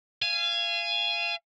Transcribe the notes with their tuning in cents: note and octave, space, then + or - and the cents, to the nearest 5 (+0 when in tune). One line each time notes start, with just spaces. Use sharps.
F5 -30 G#5 +0